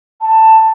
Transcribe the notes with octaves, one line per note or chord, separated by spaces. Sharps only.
A5